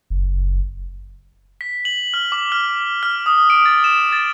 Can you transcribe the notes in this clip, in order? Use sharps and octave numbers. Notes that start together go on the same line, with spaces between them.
F#1
B6
F#7
F6
D6
F6
F6
D#6
D7
A6
E7
A6